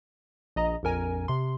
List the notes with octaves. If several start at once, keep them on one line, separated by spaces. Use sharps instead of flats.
A#1 D#5 A#5
A#1 F2 A#4 G#5
C3 C6